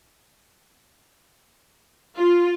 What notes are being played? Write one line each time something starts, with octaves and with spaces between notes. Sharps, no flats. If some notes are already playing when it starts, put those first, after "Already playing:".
F4